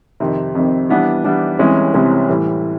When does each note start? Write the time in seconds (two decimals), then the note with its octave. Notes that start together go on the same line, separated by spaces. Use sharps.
0.20 F2 C3 D#3
0.55 F2 C3 D#3
0.89 E3 G3 B3 D4
1.24 E3 G3 B3 D4
1.59 C2 C3 E3 G#3 C#4
1.94 C2 C3 E3 G#3 C#4
2.29 A2 E3 G3